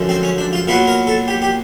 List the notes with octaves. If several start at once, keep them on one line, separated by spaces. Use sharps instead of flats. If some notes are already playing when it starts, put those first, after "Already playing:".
Already playing: F#2 D3 F3 G#3
C4
C#4
D4
F4
A#2 F#3 B3 F4
A#4
A4
G4
G4